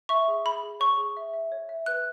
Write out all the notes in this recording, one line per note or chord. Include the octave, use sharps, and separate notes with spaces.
E5 C#6
G#4
G#4 B5
G#4
C#5 C#6
G#4
E5
E5
C#5
E5
B4 F#6